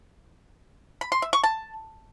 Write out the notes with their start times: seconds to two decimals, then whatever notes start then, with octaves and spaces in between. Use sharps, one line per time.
1.01 B5
1.12 C6
1.22 E5
1.33 C#6
1.43 A5